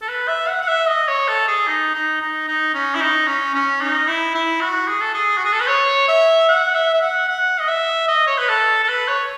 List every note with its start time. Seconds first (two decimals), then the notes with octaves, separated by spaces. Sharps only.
0.02 A4
0.08 B4
0.27 E5
0.48 F#5
0.62 F#5
0.68 E5
0.87 D#5
1.08 C#5
1.28 A4
1.48 G#4
1.68 D#4
1.94 D#4
2.21 D#4
2.48 D#4
2.74 C#4
2.95 E4
3.01 D#4
3.27 C#4
3.54 C#4
3.81 D#4
4.08 E4
4.35 E4
4.61 F#4
4.88 G#4
5.01 A4
5.14 G#4
5.37 F#4
5.45 G#4
5.52 A4
5.60 B4
5.68 C#5
6.08 E5
6.49 F#5
6.75 E5
6.93 E5
7.01 F#5
7.28 F#5
7.60 D#5
7.68 E5
8.08 D#5
8.27 C#5
8.38 B4
8.48 A4
8.83 A4
8.88 B4
9.08 C#5